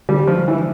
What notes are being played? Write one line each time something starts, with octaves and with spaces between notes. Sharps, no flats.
D3 G3
F3
E3